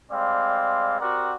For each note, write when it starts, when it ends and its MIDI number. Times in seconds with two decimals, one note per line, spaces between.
0.11 0.96 55
0.11 0.96 56
0.11 0.96 60
0.11 0.96 74
0.11 0.96 77
1.00 1.34 60
1.00 1.34 66
1.00 1.34 67
1.00 1.34 70
1.00 1.34 74
1.00 1.34 78